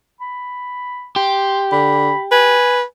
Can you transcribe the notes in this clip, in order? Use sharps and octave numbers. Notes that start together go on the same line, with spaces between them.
B5
G4 C6
D3 B5
B4 G#5